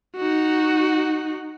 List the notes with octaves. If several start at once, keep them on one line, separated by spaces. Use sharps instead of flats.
D#4 F#4